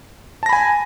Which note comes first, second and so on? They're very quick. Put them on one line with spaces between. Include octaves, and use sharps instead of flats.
A5 A#6 B5 G#5